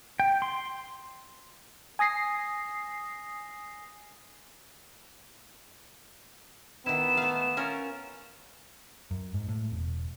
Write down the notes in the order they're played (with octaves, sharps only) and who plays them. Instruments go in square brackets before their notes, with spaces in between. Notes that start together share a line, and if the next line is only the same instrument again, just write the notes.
[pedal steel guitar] G5
C6
[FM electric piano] G#5 D#6 A#6 C7
[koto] D#3 E4 [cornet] B3 [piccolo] E7
[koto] A3 F5
C#4 F4 A#4
[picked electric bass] F#2
G#2
A2
E1